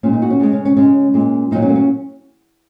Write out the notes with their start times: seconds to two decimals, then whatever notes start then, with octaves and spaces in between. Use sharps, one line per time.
0.03 A#2 G#3 C#4
0.13 D#4
0.22 F#4
0.30 C#4
0.40 C#3 G#3
0.53 C#4
0.65 C#4
0.77 C#3 G#3 C#4
1.14 A#2 G#3
1.51 A#2 F#3 D#4
1.62 C#4
1.69 A#3
1.75 C#4